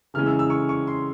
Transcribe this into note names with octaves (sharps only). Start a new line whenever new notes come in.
C#3 E3 G#3 C#4 F6
E6
E6
C#6
C#6
C6